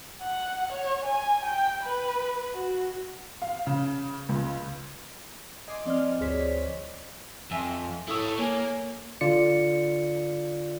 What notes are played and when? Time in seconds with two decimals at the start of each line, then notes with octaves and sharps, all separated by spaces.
0.21 F#5
0.72 C#5
1.05 G#5
1.45 G5
1.84 B4
2.54 F#4
3.42 F5
3.67 C#3
4.29 C#2
5.68 D#5 G#5 C6 D6
5.86 F3 C4 D5 D#5 F6
6.20 D2 G2 G#4 C5 C#5 B6
7.51 F2 E5 G#5 E6
8.08 E4 A4 C#5 D#6 E6
8.39 A#3 C#5 G#5 G7
9.21 D3 F4 D5 C#7